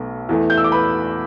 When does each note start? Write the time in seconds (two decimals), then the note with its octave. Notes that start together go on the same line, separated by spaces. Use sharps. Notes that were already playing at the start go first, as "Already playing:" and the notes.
Already playing: B1 B2 A3
0.29 E2 E3 A3
0.50 G6
0.58 E6
0.64 D6
0.72 B4 B5